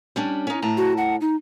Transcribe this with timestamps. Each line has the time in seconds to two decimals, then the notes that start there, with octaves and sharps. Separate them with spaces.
0.16 G3 C#4 D4
0.47 C#4 D#4
0.62 A2 A5 A#5
0.77 F#4
0.97 F#5
1.21 D#4